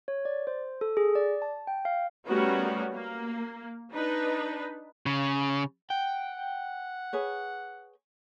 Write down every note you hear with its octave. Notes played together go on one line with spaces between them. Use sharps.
C#5
D5
C5
A4
G#4
D5
A5
G5
F5
G3 A3 B3 C#4 F#4 A#4
A#3
D4 D#4 B4
C#3
F#5 G5
G#4 B4 C#5